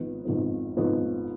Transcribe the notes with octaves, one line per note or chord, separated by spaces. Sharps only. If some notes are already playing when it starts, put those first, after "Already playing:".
Already playing: G#1 G#2 F3 B3
G#1 G#2 F3 B3
G#1 G#2 F3 B3